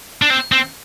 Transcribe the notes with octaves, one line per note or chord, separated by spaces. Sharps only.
D4
C4
C4